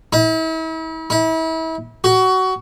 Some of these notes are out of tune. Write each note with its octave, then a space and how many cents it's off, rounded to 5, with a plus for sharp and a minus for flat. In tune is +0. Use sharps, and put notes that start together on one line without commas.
E4 -40
E4 -35
F#4 +20